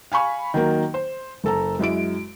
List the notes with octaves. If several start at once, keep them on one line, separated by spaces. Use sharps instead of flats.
F5 G#5 B5 C#6
D#3 F#3 A#3
C5
F#1 A4 A#5
F#2 G#3 E4 D7